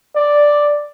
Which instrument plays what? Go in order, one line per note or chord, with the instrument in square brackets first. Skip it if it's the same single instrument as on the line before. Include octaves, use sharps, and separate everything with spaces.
[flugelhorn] D5